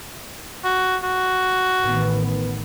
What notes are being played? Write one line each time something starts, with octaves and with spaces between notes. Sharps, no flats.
F#4
F#4
A1 D#3 B3